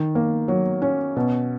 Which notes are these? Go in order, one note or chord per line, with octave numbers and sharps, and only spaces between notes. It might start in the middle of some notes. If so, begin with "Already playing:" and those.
Already playing: D#3
A#3
F#3
C#4
B2